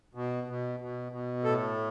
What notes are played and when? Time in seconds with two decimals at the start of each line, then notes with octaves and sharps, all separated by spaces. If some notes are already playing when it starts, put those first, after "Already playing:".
0.15 B2
0.47 B2
0.80 B2
1.12 B2
1.44 A2 A4